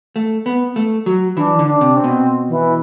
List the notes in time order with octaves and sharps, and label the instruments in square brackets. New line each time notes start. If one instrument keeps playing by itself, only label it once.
[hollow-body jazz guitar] A3
B3
A3
F#3
[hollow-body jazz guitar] E3 [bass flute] D4
[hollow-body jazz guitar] D3
[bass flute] D4
[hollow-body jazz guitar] C3
[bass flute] C4
[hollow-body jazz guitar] B2
[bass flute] E3